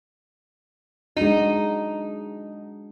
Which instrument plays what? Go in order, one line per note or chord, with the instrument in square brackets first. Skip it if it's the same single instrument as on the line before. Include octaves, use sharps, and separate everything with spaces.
[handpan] G#3 D4 F#4 [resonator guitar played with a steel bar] D#4